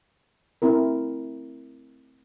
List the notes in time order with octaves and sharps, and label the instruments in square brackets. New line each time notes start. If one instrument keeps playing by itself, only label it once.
[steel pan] A3 C4 E4 A#4